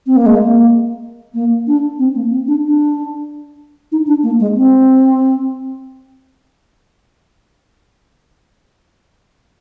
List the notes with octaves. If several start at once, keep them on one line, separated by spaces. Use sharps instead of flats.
C4
A#3
G#3
A#3
A#3
D4
C4
A#3
C4
D4
D4
D#4
D4
A#3
G#3
C4